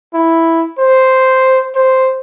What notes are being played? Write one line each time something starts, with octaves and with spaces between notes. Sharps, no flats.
E4
C5
C5